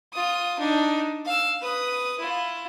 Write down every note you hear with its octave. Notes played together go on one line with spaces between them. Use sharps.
F4 D#6
D4 D#4
F5 E6
B4 D#6
E4 F4